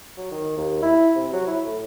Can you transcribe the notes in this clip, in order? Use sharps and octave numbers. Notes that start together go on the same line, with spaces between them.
F#3
D#3
D#2
E4
C3
F#3
E4
A2